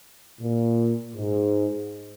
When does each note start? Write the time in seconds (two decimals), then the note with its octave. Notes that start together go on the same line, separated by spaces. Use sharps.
0.41 A#2
1.14 G#2